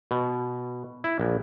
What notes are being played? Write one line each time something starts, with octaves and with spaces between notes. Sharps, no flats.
B2
E4
A#1